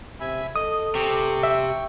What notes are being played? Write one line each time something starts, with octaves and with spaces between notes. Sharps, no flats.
C3 E5 G#5 B5
A4 D#5 D#6
C3 G5 C#6
E5